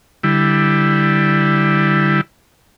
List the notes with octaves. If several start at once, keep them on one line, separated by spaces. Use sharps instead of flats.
D3 G3 E4